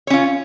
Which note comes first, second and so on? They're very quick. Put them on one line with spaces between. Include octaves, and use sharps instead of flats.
C#5 C#4 F4